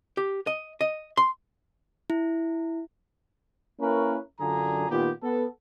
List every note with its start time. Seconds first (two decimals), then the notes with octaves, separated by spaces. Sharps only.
0.17 G4
0.47 D#5
0.81 D#5
1.17 C6
2.10 E4
3.80 A#3 C#4 E4 A#4 B4 C#5
4.40 F#2 D3 D4 F4 G#4 A#5
4.90 A#2 D#3 B3 F4 G4
5.23 B3 A4